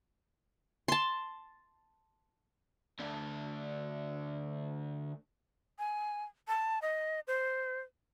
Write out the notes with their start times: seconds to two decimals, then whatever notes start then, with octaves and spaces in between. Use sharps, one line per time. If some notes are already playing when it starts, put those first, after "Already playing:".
0.88 A5 C6
2.99 D2 D4
5.79 G#5
6.48 A5
6.82 D#5
7.27 C5